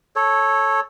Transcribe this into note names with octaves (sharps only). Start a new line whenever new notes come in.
A4 C#5